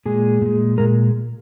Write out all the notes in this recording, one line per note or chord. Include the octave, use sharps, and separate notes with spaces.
A#2 G#3 G#4
A#2 G#3
A#2 G#3 A#4